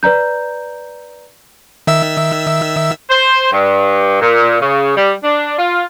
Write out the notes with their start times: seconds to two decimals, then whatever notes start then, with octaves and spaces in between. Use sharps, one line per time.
0.03 B4 D5 A#5 G6
1.87 D#3 E5 E6
3.10 C5
3.52 G2
4.21 A#2
4.61 C#3
4.96 G3
5.23 D4
5.59 F4